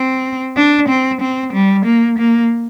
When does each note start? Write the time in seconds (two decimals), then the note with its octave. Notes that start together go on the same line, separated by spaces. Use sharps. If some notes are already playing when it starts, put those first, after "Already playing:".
Already playing: C4
0.56 D4
0.89 C4
1.21 C4
1.53 G3
1.85 A#3
2.19 A#3